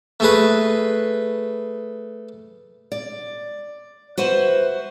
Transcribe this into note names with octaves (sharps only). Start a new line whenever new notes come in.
A3 G#4 B4
D5
F#4 B4 C5 E5